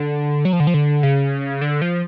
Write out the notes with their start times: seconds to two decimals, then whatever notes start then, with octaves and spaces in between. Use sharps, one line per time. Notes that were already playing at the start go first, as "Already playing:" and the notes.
Already playing: D3
0.45 F#3
0.53 F3
0.60 D3
0.67 F3
0.74 D3
1.03 C#3
1.61 D3
1.82 F3